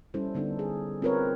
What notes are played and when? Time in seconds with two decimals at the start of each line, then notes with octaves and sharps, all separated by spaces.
0.14 G3 C#4 E4 A4 C5
0.35 D3 B3 D4 D#4 A4
0.59 G#4
1.02 C4 F4 A#4 B4 C#5